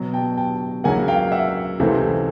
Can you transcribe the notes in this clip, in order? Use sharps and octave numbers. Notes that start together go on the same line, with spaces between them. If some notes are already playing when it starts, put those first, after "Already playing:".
Already playing: B2 F#3 B3
G5 A5
G5 A5
C#2 C#3 F#3 A#3 F#5 G#5
F5 G5
E5 F#5
C#2 C3 E3 A3 C4